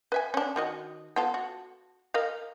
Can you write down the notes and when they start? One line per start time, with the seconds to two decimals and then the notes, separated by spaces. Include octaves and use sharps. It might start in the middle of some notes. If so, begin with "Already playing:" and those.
0.12 B4 E5 G#5
0.34 C#4 D4
0.56 D#3 F#4 D#5
1.16 B3 F4 A4
1.34 F#4
2.14 A#4 D#5 F5